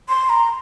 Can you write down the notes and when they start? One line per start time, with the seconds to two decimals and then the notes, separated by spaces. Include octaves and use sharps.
0.09 C6
0.29 A#5